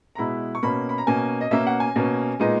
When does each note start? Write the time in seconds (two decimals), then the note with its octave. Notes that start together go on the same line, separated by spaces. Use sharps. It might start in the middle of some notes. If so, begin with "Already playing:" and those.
0.15 A#5
0.18 B2 G#3 B3 E4 B5
0.55 C#6
0.63 B2 A#3 C#4 B5
0.89 B5
0.98 A#5
1.07 B2 A#3 C#4 G#5
1.41 D#5
1.51 B2 A#3 C#4 E5
1.67 F#5
1.80 G#5
1.96 B2 A#3 C#4
2.39 A#2 G#3 B3 D#4